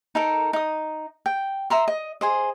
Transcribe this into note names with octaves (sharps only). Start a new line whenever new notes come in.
D#4 A4 A#4
D#4 D#6
G5
E5 A#5 C6
D#5
G#4 C5 D#5